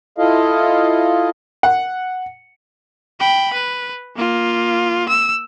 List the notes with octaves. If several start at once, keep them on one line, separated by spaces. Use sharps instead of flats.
E4 F4 A4 D#5 F5
F#5
G5 B5
B4
A#3 F4
E6